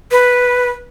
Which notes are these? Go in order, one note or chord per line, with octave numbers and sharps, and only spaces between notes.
B4